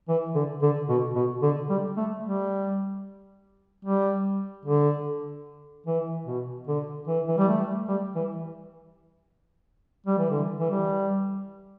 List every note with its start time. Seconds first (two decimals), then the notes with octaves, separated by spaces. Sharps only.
0.08 E3
0.35 D3
0.62 D3
0.89 B2
1.15 B2
1.42 D3
1.69 G3
1.97 A3
2.23 G3
3.85 G3
4.65 D3
5.86 E3
6.27 B2
6.67 D3
7.07 E3
7.28 E3
7.38 G3
7.48 A3
7.88 G3
8.15 E3
10.06 G3
10.18 E3
10.30 D3
10.60 E3
10.71 G3